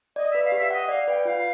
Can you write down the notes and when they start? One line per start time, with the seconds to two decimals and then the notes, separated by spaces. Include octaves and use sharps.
0.16 D5 D#5
0.29 E5
0.35 B4
0.43 F5
0.52 G4 E5
0.71 D#5 F#5
0.89 D5 F5
1.07 B4 G5
1.25 F4 F5